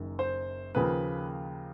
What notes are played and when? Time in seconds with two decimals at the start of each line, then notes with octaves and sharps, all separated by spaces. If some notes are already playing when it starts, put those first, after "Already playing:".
Already playing: F#1 F#2 D#3
0.19 C5
0.75 D#2 C#3 F3 A#3 B4